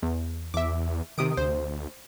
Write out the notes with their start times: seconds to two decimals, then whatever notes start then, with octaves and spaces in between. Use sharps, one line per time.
0.03 E2
0.54 E2 E5 D6
1.18 C3 D#3 D#6 D7
1.37 D2 C5